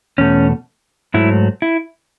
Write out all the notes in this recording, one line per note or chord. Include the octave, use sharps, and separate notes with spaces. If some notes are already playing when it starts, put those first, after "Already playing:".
E2 B2 A3 C#4
G#2 F#3 A3 E4
E4